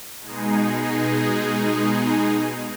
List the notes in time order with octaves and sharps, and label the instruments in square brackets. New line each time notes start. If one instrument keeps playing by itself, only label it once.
[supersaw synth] B2 G#3 D#4 G#4